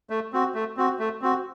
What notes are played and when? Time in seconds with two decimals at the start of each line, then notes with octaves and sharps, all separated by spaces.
0.10 A3
0.33 C4 F#4
0.54 A3
0.77 C4 F#4
0.99 A3
1.22 C4 F#4